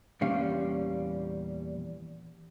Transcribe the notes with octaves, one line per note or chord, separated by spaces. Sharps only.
E2 A#2 G3 C#4 F5